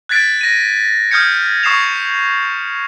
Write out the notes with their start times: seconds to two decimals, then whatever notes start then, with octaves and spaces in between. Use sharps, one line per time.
0.09 F#6 G#6 A6 B6 D7
0.41 A#6 D#7
1.11 D#6 F6 G6 G#6 C#7
1.63 C#6 D#6 C7 E7 F7